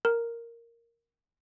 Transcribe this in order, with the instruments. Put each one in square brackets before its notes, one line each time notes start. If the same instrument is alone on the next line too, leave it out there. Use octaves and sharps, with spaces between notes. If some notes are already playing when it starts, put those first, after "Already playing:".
[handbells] A#4